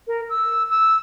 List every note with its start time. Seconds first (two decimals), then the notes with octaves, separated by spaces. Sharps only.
0.08 A#4
0.29 E6
0.69 E6